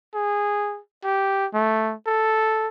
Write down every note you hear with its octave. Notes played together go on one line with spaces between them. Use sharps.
G#4
G4
A3
A4